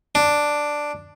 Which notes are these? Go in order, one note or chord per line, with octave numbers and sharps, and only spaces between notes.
D4